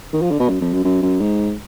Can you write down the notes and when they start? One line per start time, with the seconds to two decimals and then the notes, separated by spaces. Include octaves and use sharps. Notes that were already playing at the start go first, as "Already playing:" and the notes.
0.13 D#3
0.22 F3
0.31 D3
0.40 B2
0.49 F#2
0.61 F2
0.73 F#2
0.84 F#2
1.03 F#2
1.21 G#2